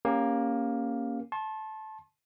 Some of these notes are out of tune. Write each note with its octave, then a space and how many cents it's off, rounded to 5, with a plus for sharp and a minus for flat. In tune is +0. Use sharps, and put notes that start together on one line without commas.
A#3 +10 C#4 +0 G4 +25
A5 -15 C6 +40